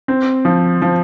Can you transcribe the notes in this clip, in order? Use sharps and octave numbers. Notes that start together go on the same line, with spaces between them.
C4
F3
F3